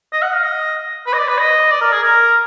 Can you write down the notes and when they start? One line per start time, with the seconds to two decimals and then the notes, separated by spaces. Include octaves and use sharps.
0.12 D#5
0.22 F#5
0.33 F5
0.44 D#5
1.07 B4
1.14 D#5
1.18 D5
1.28 B4
1.39 D#5
1.71 D5
1.81 A#4
1.92 G#4
2.03 A#4